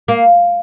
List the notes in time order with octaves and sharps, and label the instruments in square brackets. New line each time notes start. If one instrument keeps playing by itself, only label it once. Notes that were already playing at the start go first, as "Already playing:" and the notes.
[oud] A#3